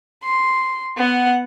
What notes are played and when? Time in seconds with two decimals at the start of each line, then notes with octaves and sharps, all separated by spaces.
0.24 C6
0.97 B3 F#5